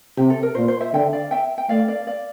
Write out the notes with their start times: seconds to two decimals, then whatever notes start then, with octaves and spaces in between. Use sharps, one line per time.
0.17 C3 G4
0.30 A4
0.43 A#4
0.55 A#2 C5
0.68 C5
0.80 C5 E5
0.93 D3 E5 G5
1.13 D5 F5
1.31 E5 G5
1.58 G5
1.69 A3 D5 F5
1.88 D5 F5
2.07 D5 F5